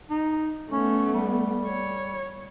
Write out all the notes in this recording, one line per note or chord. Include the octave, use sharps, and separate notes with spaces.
D#4
A3 B3 C#4
G3
C#5